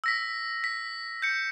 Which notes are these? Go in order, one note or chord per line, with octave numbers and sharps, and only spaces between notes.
E6 A#6 B6
B6
G6 C#7